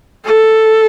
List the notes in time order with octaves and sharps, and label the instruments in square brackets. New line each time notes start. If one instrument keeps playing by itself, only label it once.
[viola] A4